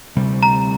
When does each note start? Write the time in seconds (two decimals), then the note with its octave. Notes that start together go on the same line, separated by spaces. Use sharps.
0.15 D2 C3 G3
0.43 A#5